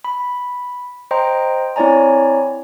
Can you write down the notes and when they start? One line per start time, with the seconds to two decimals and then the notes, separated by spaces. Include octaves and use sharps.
0.04 B5
1.11 C5 D#5 G5 A#5 C6
1.76 C4 E4 C#5 D5 G#5 A#5